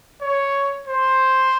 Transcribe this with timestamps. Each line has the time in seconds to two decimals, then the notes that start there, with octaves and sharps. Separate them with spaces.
0.21 C#5
0.87 C5